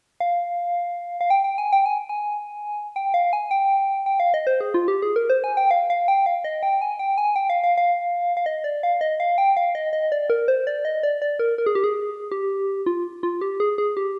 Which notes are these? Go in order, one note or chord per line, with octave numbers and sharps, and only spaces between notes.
F5
F5
G5
G5
G#5
G5
G#5
G#5
G5
F5
G#5
G5
G5
F5
D#5
C5
G#4
F4
G4
G#4
A#4
C5
G#5
G5
F5
F5
G5
F5
D#5
G5
G#5
G5
G#5
G5
F5
F5
F5
F5
D#5
D5
F5
D#5
F5
G5
F5
D#5
D#5
D5
A#4
C5
D5
D#5
D5
D5
A#4
A#4
G#4
G4
G#4
G4
F4
F4
G4
G#4
G#4
G4